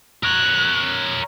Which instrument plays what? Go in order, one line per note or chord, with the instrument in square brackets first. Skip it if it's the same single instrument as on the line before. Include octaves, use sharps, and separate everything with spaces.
[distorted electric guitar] A#4 C#5 [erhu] F#6